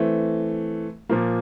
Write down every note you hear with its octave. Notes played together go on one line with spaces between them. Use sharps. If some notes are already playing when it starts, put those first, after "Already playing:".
Already playing: E3 A3 C4
A#2 F3 A#3